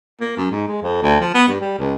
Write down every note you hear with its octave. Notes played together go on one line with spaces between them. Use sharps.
A#3
F#2
G#2
G#3
F2
D2
F3
B3
G2
G3
C#2